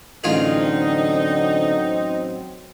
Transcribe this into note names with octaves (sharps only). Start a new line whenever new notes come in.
A1 D3 F#3 C4 D#4 F4 G#4